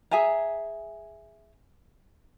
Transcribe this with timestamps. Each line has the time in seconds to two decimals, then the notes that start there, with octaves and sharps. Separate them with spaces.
0.11 G#4 E5 G#5 A#5